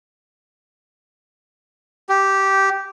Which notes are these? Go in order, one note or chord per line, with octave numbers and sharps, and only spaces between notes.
G4